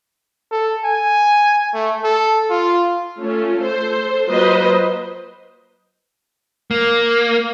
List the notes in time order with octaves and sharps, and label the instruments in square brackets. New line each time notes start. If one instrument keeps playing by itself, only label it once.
[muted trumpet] A4
G#5
A3
A4
F4
[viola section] A3 C#4 F4
A4 C5
F#3 A#3 F4 B4 C5 D#5
[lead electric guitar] A#3